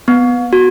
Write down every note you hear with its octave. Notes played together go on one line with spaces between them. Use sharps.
B3
F#4